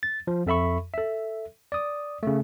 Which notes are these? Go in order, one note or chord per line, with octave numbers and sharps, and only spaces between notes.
A6
F3
F2 A4 E5 B5 C#6
A4 E5
D5 D#6
C#3 A3